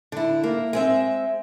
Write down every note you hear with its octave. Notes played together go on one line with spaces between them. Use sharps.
D3 E4
A#3
G#3 C4 E5